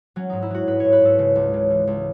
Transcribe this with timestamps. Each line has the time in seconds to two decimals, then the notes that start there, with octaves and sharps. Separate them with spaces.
0.16 F#3 C#4
0.30 G#2 D#4
0.42 E4
0.50 F#3 F#4
0.67 G#2 B4
0.80 G#2 C#5
0.92 B4
1.02 G#2 A4
1.19 C#3
1.36 C#2
1.53 C#3
1.70 E3
1.87 C#2